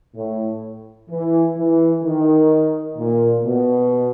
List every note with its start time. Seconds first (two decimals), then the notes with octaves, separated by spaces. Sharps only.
0.15 A2
1.09 E3
1.56 E3
2.02 D#3
2.96 A#2
3.43 B2